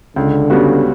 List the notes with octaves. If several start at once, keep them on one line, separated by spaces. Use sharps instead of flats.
C#2 D3
C#3 G3 B3 F#4